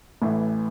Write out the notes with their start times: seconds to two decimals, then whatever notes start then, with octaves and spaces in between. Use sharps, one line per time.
0.22 A1 A2 E3 A3